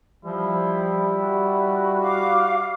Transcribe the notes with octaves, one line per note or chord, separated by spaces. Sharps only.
F3 G3 E4
F#4
F5 D6